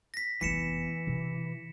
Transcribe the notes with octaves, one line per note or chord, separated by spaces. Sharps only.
A#6 B6
F1 E3 B3 B6 C#7 E7
C3